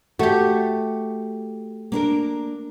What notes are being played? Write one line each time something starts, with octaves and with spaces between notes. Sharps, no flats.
A3 F#4 G4
A#3 D4 A#4